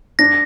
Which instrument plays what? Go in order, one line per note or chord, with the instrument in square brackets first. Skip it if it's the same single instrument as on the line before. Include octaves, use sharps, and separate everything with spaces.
[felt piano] D4 [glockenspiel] A#6